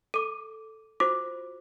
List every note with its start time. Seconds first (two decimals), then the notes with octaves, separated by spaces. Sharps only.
0.14 A4 D6 D#7
1.00 F4 F#4 C5 D6